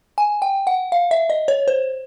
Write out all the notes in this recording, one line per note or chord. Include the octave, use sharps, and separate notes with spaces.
G#5
G5
F#5
F5
E5
D#5
C#5
C5